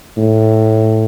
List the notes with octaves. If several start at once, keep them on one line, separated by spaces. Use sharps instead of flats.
A2